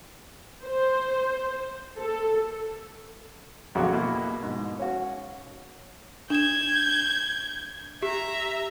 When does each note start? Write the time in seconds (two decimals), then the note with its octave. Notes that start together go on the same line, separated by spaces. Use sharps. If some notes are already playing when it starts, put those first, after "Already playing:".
0.63 C5
1.99 A4
3.75 A#1 F2 C#3 F#3 F#4 D6
3.93 B2 A#3 E4
4.43 G#2 B2
4.79 C#4 F#4
6.30 D4 G6 G#6 E7
8.03 G4 E5 A#5